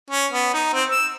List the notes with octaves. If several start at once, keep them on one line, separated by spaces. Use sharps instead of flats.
C#4
B3
D#4
C4
E6